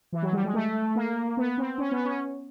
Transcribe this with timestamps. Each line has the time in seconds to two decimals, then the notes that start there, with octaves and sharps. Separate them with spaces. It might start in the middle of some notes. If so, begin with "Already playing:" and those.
0.12 E3
0.22 F#3
0.32 G3
0.44 G#3
0.54 A3
0.95 A#3
1.37 B3
1.58 C4
1.78 C#4
1.91 B3
2.05 C#4